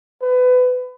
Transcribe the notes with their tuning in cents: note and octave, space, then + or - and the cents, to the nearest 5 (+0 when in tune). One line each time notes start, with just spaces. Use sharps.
B4 +25